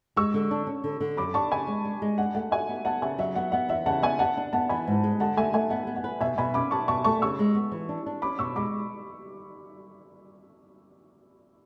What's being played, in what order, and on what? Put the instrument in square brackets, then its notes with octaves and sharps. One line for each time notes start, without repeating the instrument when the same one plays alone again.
[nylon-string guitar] G#3 [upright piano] C#6 E6
[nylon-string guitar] D3
D4
C#4
D3
D3
[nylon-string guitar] F#2 [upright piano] B5 D6
[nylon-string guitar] D4 [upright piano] A5 C#6
[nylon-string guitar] C#3 [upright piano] G#5 B5
[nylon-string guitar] G#3
D4
G#3
[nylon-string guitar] D4 [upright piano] F#5
[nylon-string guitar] A3 [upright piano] F#5
[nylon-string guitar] F#4 [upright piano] E5 G#5
[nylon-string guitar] B3
[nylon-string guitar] B3 [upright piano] F#5 A5
[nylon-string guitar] C#3 [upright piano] E5 G#5
[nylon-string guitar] F#3 [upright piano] E5
[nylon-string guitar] B3 [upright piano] F#5
[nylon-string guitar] B3 [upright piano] F#5
[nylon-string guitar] E2 [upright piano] E5
[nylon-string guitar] C#3 [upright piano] F#5 A5
[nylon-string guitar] B3 [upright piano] E5 G#5
[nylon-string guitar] B3 [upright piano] F#5 A5
[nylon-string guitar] D4
[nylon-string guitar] B3 [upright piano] F#5 A5
[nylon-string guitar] E3 [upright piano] G#5 B5
[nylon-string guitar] G#2
G#3
[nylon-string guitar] D3 [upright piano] F#5 A5
[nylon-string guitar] A3 [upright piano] E5 G#5
[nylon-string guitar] A3 [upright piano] E5 G#5
[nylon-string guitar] B3 [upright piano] F#5
[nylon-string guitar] B3
[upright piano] F#5
[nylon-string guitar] B4
[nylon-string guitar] B2 [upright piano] E5 G#5
[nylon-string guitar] B2 [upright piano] G#5 B5
[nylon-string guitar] C#4 [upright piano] B5 D6
[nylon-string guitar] B4 [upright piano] A5 C#6
[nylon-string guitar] B2 [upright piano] A5 C#6
[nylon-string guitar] A3 [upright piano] A5 C#6
[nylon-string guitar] C#3 [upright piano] C#6 E6
[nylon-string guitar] G#3
B3
E3
D4
D4
[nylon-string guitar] C#4 [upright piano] B5 D6
[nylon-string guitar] B2 [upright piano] C#6 E6
[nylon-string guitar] G#3 [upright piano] B5 D6